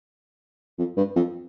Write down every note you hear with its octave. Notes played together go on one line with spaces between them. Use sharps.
F2
G2
F2